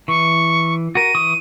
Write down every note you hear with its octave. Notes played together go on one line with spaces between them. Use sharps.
E3 C#6
F#4 A#4 D#7
E3 C#6 D#6